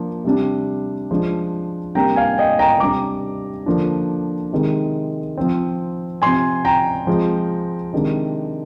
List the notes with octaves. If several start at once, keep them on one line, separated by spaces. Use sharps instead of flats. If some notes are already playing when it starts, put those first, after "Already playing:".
Already playing: F3 A#3 D4
C3 G3 D4
F3 G#3 D4
C3 G3 A#3 D4 G5 A#5
F5 G#5
D#5 G5
G5 A#5
C3 G3 D4 A#5 D6
D3 F3 A#3 D4
C3 D#3 G#3
F3 C4
C3 F3 C4 G#5 C6
G5 A#5
F3 G#3 C4
C3 D#3 G#3 D4